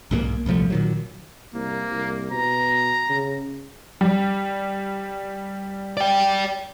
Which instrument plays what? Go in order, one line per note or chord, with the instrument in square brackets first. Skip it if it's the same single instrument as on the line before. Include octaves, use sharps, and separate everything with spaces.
[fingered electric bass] B1 G#2 F3 A#3
D#1 C2 F3 A3
A#2 D#3 F#3
[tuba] C2 [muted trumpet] A#3
[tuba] C2
[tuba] B2 [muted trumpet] A#5
[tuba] C#3
[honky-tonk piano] G3
[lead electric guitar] D5 G5